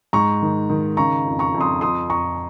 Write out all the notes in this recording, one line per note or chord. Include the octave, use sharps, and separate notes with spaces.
G#2 A#5 C#6
D#3
D#3
C#3 A#5 C#6
F2
A#5 C#6
F2
C6 D#6
F2 C6 D#6
F2 A#5 C#6